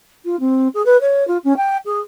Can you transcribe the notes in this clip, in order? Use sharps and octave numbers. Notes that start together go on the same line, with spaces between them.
F4
C4
G#4
B4
C#5
F4
C#4
G5
G#4